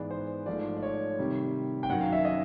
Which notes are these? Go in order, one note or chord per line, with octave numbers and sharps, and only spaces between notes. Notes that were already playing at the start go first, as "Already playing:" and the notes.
Already playing: G#2 E3 G#3 B3 D5
C5
G#2 F3 A3 D5
D5
C#5
C3 D#3 G3
G5
F#2 D#3 F#3 F#5
F5
E5
D#5